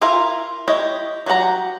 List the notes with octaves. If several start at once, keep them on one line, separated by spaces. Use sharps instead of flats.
E4 F4 A#4 E5 F5
E4 G4 C#5 D#5
F#3 F#4 G4 F#5 A#5